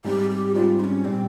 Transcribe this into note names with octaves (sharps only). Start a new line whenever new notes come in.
G#2 G3 C4 G4
G4
G#2 G3 C4 F4
D#4
C#4
A#2 G3 C4